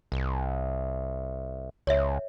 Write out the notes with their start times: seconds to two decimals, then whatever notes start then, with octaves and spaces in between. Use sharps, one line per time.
0.12 C2
1.87 C#2 C#5 E5